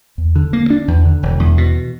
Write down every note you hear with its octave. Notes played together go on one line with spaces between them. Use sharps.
E2
D3
A#3
D4
E2
D3
E1
E2
B2